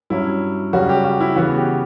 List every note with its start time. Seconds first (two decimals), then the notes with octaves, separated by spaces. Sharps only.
0.10 G2 F#3 C#4 E4
0.73 F#2 C#3 G3 C#4 F#4
0.89 G4
1.04 F#4
1.21 E4
1.36 C#3 E3 B3 F#4
1.57 G4